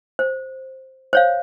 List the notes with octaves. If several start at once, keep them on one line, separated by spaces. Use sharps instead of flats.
C5
C5 C#5 F5